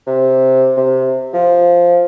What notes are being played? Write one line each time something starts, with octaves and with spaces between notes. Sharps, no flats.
C3
C3
F3